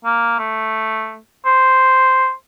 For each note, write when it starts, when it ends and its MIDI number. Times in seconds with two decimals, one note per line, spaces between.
0.05 0.38 58
0.39 1.18 57
1.45 2.32 72